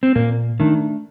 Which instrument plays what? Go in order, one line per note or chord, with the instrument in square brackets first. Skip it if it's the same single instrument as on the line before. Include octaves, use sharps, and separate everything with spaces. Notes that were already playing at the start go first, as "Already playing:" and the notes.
[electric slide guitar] C4
[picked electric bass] A#2 [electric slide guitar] A#3
[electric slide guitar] D#3 [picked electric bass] A3 D4